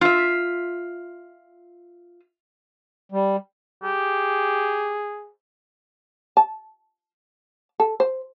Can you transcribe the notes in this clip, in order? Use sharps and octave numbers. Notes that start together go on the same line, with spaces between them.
F4 E5
G3
G4 G#4
A5
A4
C5